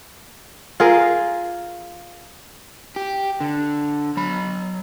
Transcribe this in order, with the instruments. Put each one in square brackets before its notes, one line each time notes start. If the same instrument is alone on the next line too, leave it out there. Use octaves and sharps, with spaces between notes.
[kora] F4 G#4 A#4
[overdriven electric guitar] G4
D3
F#3 B5